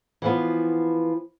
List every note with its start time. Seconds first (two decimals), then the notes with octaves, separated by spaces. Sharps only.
0.22 E3 F3 B3